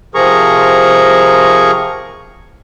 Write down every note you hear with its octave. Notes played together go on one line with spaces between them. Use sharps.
C3 F3 G#4 A#4 A#5 C#6